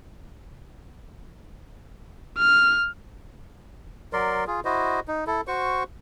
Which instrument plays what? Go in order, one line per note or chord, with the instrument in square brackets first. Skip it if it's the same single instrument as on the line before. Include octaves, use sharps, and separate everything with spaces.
[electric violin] F6
[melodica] F#3 A#4 D5 C6
F4 G#4
E4 F#4 C5 D#5
D#4
E4 A4
F#4 C5 C#6